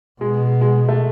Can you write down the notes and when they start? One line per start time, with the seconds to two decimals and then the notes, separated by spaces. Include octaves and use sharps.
0.21 B2 G#3
0.61 G#3
0.89 A3